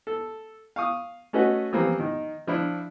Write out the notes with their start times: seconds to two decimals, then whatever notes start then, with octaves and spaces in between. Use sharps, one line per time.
0.07 A4
0.76 F5 C#6 D#6
1.33 A3 C#4 F#4 B4 D#5 F#5
1.73 E3 F3 G3 A#3 C4
2.00 D#3
2.47 F3 D4 E4